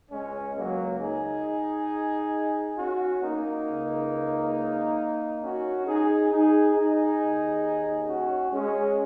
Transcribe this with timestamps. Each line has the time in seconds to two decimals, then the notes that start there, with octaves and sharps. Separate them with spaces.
0.11 C#2 C#3 G#3 C#4
0.56 F#3 A#3
1.00 D#4 G#4
2.77 C#4 F#4
3.21 A#3 D#4
3.66 C#2 C#3
5.43 C#4 F#4
5.86 D#4 G#4
6.31 D#4 G#4
6.76 D#4 G#4
7.20 D#2 D#3
8.08 C#4 F#4
8.52 G#3 C#4